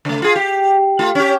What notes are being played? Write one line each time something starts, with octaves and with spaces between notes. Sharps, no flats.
C#3 A3
F4 G#4
G4
A3 F4
C#4 G4